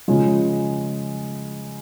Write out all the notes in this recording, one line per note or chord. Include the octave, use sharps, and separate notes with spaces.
C#3 F3 G#3